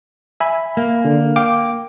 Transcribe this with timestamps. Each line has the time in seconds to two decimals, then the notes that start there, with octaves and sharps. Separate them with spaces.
0.40 E5 G#5 B5
0.77 A#3
1.05 D3
1.36 F5 G5 D6